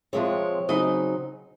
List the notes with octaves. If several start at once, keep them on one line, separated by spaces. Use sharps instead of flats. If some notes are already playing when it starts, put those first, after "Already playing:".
C3 F3 G#3 C4 C#5
C#3 F#3 C4 D#4 D#5